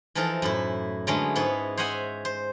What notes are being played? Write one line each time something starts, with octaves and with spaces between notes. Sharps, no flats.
E3 F3 D#4 A4 A#4
F#2 A2 E4
D3 F#3 G#3 A3 B3 C#4
G#2 B3 E4 C#5
C5 C#5 D#5 E5 F#5 G#5
C5